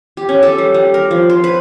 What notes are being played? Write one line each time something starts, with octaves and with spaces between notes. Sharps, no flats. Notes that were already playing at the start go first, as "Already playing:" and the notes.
G4
C#4
A4
G3
G3
A#4
F3
C5
B4